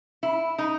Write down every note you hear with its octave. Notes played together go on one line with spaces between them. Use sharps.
E4
D#4